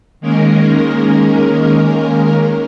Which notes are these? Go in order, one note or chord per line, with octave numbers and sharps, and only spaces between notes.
D#3 G#3 A#3 C#4 A#4